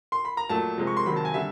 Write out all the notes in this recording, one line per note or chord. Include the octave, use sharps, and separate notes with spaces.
C6
B5
A#5
A#2 F#3 A3 A5
C3 F3 G#3
C#6
C6
C3 D#3 F#3 B5
A5
G#5
D3 G3 E5